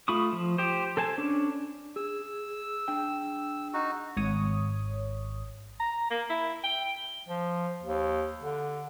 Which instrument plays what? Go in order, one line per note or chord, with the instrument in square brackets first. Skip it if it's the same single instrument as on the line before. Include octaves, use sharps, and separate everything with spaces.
[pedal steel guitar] A3 F4 B5 C#6 D#6
F3
G4 C5
A4 C5 G#5 A5
C#4 D4
[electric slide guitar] G#4 [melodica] E6
[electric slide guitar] D4 G#4 G5
[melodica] D#4 F#4
[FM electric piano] G#1 C#5 D#6
[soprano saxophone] A#5
A#3
E4
G5
[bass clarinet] F3
D#2
D3